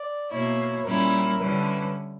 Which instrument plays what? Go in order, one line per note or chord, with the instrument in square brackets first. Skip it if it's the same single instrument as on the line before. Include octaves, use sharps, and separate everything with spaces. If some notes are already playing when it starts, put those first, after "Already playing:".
Already playing: [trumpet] D5
[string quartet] B2 A#3 E4 [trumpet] C#5
[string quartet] A#2 G3 C#4 E4 [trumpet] A#4
[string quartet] D3 G3 C#4 E4 [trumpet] B4